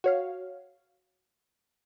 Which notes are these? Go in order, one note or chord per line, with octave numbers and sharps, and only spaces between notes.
F#4 C#5 F5